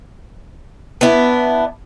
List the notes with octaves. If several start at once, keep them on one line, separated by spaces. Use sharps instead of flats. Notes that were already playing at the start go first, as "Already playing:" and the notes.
B3 D4 E4